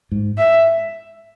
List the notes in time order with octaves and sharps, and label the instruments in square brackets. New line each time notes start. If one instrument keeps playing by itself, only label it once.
[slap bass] G#2
[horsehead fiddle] E5